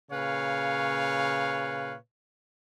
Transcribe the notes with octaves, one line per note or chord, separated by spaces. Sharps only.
A#2 C#3 B4 C#5 F5